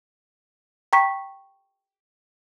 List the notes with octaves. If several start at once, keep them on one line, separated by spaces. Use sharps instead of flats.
G5 A#5 C#6 B6